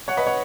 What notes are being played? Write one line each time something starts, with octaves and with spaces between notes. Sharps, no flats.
C#5 F#5
B4 D#5
C#5 F#5